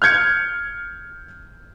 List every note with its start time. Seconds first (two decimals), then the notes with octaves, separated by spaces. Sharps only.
0.02 F6 G6 G#6 C#7